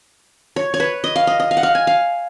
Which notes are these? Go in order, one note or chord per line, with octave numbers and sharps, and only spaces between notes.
C#5
C#5
B4
D#5
F5
D#5
D#5
F5
F#5
F5
G#5
F5